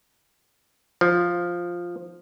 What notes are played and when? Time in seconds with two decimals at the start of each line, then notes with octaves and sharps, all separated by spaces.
1.01 F3